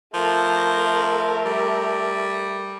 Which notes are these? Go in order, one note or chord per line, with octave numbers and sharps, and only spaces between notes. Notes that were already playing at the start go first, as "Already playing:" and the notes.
F3 A3 A#4
G3